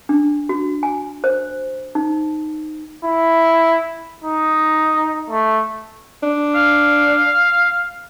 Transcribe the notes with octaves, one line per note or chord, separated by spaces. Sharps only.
D4
F#4
G#5
C5
D#4
E4
D#4
A3
D4
F5